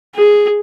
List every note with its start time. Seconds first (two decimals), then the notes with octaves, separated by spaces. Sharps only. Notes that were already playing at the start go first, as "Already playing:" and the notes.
0.15 G#4